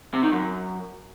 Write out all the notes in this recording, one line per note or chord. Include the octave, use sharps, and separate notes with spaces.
C3
D#3
F#2